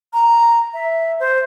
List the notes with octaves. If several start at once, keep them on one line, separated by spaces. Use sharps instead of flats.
A#5
E5
C5